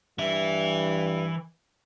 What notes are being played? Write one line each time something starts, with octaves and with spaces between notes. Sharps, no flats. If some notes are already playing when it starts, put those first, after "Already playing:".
G2 E3 E5